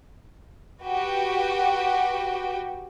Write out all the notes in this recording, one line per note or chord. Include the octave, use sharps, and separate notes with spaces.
F#4 G4 B4 G5